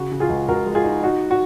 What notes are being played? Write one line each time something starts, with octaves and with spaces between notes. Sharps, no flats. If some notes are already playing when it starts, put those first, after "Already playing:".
Already playing: C#3 F#4
C#3
F4 G#4
C#2
C#2 F#4 A#4
G#3
F4 G#4
D#4
D#4 F#4
F#4